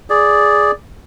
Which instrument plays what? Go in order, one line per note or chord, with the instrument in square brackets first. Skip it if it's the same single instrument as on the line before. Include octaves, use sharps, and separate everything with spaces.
[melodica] G#4 D5